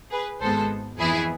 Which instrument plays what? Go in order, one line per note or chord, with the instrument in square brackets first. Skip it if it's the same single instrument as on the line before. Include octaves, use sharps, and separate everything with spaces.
[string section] G#4 B4
G#1 G#2 G#3 B3 A4 C5
F2 E3 B3 E4 G#4